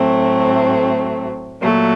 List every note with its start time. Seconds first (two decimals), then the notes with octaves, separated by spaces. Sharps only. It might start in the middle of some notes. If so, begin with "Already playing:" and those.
Already playing: A2 F#3 A3 C4
1.61 A#2 F#3 A3